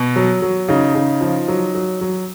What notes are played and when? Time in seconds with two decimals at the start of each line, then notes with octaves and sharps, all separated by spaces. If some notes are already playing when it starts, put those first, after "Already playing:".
Already playing: B2
0.16 F#3
0.42 F#3
0.68 C#3 D#4
0.95 C#3
1.21 F3
1.48 F#3
1.75 F#3
2.01 F#3